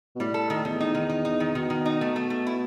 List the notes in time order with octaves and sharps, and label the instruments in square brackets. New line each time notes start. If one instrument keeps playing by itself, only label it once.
[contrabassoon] B2
[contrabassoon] A2 [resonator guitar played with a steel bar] G3
[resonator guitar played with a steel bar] A4
D#3
[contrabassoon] E2 [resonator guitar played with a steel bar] D#3
[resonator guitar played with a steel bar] D#4
D#3
D#4
D#4
D#3
[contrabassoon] B2 [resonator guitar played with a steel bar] D#3
[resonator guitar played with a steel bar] D#3
D#4
A3
A3
A3
E4